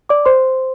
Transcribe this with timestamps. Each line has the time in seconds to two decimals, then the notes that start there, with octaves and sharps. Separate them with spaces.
0.09 D5 D6
0.25 C5 C6